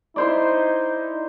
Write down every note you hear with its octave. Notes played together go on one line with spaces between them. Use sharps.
D#4 E4 C5 D5